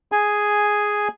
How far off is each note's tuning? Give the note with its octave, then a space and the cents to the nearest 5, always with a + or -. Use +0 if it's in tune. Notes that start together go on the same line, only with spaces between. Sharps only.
G#4 +0 G#5 +0